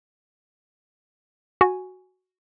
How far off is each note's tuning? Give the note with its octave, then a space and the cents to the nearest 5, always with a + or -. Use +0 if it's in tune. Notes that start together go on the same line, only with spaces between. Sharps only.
F#4 +0 G#5 +0